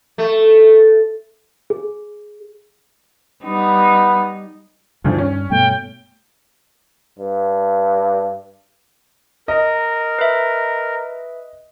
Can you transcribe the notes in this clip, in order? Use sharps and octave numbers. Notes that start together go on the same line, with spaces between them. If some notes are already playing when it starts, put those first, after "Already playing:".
A3
G#4
G3 B3 D#4
D2 G2 D#3 F3 D4
C#4
G2 B2 A3 G5
G2
A#4 D#5
B4 E5